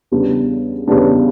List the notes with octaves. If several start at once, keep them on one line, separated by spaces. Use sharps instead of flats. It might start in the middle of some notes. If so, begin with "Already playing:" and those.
E2 C#3 G3 B3 D4
E2 C#3 G3 B3 D4